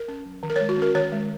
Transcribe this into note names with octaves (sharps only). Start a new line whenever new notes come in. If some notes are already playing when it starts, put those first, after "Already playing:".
Already playing: A#4
C#4
F#3
D#3
A#4
G#3 C#5
F#4
C#4 A#4
D#3 C#5
G#3